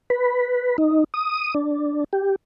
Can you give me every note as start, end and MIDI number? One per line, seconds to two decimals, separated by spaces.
0.10 0.77 71
0.78 1.04 63
1.14 1.54 87
1.55 2.04 62
2.13 2.36 67